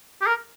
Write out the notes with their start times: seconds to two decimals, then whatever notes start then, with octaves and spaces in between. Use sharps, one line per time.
0.21 G4
0.27 A#4